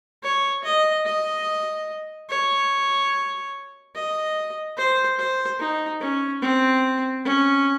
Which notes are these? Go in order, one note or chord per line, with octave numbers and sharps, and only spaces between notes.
C#5
D#5
D#5
C#5
D#5
C5
C5
D#4
C#4
C4
C#4